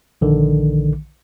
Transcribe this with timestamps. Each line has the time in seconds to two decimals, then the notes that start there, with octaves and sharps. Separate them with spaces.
0.21 A#1 D3 D#3